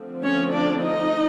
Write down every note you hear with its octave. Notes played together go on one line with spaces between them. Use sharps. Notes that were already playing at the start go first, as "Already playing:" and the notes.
Already playing: D3 F3 A3 C4
C#4 C#5
D4 D5
D#4 D#5